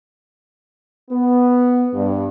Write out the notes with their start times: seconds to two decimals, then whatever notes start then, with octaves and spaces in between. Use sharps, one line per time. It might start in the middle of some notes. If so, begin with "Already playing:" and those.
1.11 B3
1.94 G2